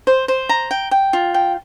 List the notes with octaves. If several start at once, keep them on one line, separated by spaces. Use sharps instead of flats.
C5
C5
A#5
G5
G5
F4
G5